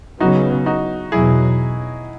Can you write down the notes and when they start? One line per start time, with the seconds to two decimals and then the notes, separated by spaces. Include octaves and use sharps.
0.20 C#3 F#3 B3 D#4 F#4
0.66 D#4 F#4
1.12 E2 B2 F#3 E4 G#4